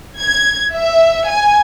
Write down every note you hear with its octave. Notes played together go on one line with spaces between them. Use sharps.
G#6
E5
G#5